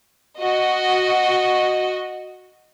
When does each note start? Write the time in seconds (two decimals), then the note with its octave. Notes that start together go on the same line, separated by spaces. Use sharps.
0.39 F#4 D#5